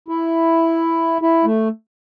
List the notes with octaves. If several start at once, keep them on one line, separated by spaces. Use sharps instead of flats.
E4
E4
A3